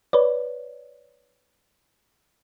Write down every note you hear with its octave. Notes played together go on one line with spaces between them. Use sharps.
B4 C#5 D5